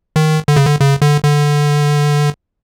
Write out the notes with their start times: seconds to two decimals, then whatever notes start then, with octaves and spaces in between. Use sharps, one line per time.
0.16 D#3
0.48 D3
0.56 C#3
0.65 D3
0.80 C#3
1.02 D3
1.23 D3